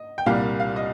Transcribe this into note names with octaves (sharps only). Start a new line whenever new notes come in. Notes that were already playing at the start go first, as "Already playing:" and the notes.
Already playing: D#5
G5
C2 A#2 G3 A#3 F5
F5
D#5